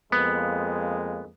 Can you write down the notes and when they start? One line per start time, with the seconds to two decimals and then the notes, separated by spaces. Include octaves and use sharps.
0.12 F2 G#3 A#3 B3